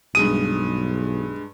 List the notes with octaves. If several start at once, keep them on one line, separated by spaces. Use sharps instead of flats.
B1 G2 G#3 D#6 D#7